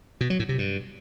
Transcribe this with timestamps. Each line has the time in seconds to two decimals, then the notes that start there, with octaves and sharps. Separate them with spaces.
0.21 B2
0.30 F#3
0.39 A2
0.49 C3
0.58 G2